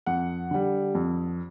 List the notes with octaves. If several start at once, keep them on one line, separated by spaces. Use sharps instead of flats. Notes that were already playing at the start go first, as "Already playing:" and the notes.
F2 F#5
D3 G3
F2